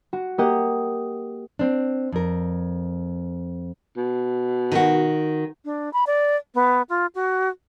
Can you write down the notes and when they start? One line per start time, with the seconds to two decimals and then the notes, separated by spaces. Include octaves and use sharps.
0.13 F#4
0.38 A#3 G4 D#5 F#5
1.59 C4 D4
2.12 F2 A#4
3.97 B2
4.72 D#3 F#4
5.65 D4
5.93 B5
6.07 D5
6.55 B3
6.89 F4
7.15 F#4